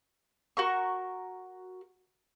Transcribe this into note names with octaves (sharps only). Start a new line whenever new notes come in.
F#4 A#4 C#6